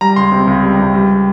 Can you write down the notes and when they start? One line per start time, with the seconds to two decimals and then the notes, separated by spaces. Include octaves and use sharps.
0.01 G3 A#5
0.16 C#2 C6
0.32 C3
0.47 C#2
0.63 G3
0.79 C#2
0.94 G3